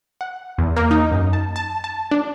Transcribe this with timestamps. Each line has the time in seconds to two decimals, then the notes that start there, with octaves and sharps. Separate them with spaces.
0.21 F#5
0.58 E2
0.76 A#3
0.91 D#4
1.11 F#2
1.33 A5
1.56 A5
1.84 A5
2.11 D4